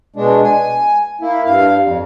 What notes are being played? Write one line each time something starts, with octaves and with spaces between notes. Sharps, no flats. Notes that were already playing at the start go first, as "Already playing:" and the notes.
B2 G#3 D4
G#5
A#3 E4
G2 F5
F2